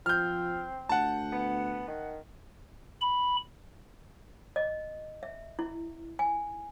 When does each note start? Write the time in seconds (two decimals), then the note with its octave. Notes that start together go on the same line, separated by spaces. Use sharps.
0.06 F3 C4 F6 G6
0.89 D2 F#5 A5
1.32 B3
1.88 D#3
3.02 B5
4.56 D#5
5.23 E5
5.59 E4
6.19 G#5